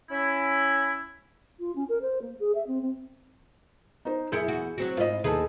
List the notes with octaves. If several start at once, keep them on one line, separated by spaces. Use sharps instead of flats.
C#4 E4
F4
C#4
A#4
C5
A#3
G#4
E5
C4
C4
D#4 C5
F#2 E4 G#4 A#4 G6 C#7
E2 F#4
F#3 C4 F#4
G#2 E4 F4 C5 D#5
D#2 D#3 D#4 G#4 A4 B4